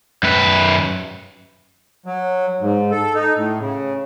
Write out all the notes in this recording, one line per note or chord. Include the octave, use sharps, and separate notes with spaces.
F#2 B4
F#3
G#2
A4
D#4
A2
C#3